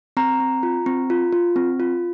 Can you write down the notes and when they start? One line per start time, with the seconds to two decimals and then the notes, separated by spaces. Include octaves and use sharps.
0.17 C4 A#5
0.40 C4
0.63 F4
0.86 C4
1.10 F4
1.33 F4
1.56 C4
1.80 F4